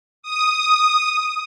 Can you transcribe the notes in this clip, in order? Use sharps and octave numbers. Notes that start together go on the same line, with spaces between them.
D#6